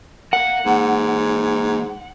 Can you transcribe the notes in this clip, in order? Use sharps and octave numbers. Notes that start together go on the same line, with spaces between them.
A#4 F5 F#5
G#2 E3 A#3